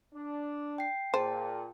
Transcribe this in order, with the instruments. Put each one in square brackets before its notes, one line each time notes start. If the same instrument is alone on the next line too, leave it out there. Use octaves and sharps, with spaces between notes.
[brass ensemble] D4
[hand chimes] G5 C7
[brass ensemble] A#2 [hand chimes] G#4 G5 A5 [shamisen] C5